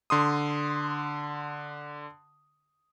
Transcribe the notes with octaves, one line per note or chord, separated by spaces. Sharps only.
D3 C6 D#6